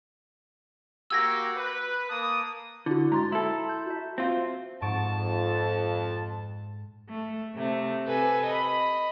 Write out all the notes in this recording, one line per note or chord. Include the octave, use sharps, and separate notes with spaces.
A#3 F#4 G4 E6 G#6 A#6
B4
A#3 A5 D#6
D3 E4 F#4
G#2 A#5 C6 A6
E4 A4
G6
F#4 E5
C4 F4
F2 G#2 A5 C#6 D7
A3
C3 A3
C3 A4 B4 G#5
D#5 B5